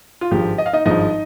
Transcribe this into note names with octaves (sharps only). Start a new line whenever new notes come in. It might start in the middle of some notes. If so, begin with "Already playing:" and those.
F4
G#1 G2 F3 G#3 G4
D#5
F5
D#4 D#5
G#1 G2 F3 G#3 D#4 D#5